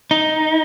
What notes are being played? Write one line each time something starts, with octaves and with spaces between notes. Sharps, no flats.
D#4